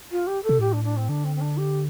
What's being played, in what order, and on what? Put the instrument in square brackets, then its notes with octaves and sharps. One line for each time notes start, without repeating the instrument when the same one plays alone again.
[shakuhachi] F4
G4
A4
[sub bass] C3
[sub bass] A2 [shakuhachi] G4
[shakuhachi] D4
D4
C4
[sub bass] D3 [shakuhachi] D4
[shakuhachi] C4
C4
D4
G4